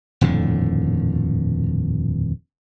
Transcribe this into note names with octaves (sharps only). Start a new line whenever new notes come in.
D#1 F2 A2 D3